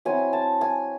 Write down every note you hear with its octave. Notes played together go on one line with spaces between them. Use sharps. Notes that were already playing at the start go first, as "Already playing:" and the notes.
F#3 C4 E4 G#5
A5
G#5